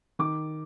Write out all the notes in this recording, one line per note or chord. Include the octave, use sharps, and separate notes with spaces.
D#3 D6